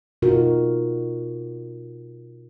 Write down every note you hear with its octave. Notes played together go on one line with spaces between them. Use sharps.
B2 D#4 F4 F#4 A#4